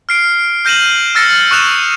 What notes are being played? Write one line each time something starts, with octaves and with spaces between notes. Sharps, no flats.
F6 C7 D7
F6 G6 A#6 D#7 E7 F#7
E6 F6 A6 A#6 C#7 E7
C#6 D#6 F#6 E7 F7